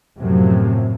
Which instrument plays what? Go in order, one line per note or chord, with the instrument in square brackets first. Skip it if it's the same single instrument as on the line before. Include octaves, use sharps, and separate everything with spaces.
[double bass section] F#2 A2 C3 F3 F#3